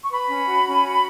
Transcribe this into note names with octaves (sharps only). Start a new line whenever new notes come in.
C#6
B4 B5
C#4
F#4
C#4
F#4